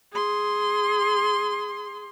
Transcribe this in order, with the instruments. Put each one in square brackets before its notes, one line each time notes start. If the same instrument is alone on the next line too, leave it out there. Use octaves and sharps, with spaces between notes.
[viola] G#4 C6